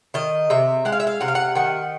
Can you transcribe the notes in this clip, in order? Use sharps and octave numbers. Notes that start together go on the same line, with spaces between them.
D#3 D#5
C3 E5
G#3 F#5
F5
E5
F5
C3 F#5
F5
F#5
D#3 F#5